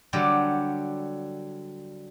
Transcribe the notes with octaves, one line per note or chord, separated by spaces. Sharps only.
D3 F#3 G3 G4